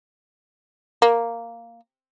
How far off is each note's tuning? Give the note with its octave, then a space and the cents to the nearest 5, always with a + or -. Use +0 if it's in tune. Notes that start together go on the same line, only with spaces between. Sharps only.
A#3 -5